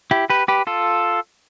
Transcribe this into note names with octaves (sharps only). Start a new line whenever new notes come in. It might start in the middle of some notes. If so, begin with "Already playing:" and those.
E4 G4
G4 B4
G4 B4
F4 A4